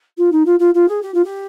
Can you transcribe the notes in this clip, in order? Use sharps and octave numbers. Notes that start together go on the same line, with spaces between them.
F4
D#4
F4
F4
F4
G#4
G4
F4
G4